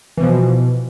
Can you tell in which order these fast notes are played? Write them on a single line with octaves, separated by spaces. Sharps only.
E3 B2 F3